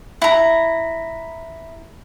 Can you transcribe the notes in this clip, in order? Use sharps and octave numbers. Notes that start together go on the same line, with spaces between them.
E4 A#5